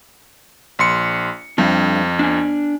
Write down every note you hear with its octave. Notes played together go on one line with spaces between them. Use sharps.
A#1 C6 C#7
F2 G3 D4
D4 G#5